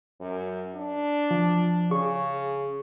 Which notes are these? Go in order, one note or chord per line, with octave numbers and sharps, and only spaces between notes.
F#2
D4
F3
C#3 G#4 C#6